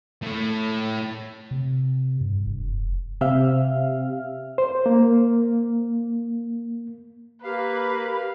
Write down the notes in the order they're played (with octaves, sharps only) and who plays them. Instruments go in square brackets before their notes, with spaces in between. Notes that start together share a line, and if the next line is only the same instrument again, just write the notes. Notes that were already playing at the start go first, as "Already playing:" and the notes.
[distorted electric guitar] A2 A3
[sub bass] C3
G2
F1
[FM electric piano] C3 C4 G4 E5 F5 F6
[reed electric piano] C5
A#3
[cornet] A#3 [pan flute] G4 [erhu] B4 [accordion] F5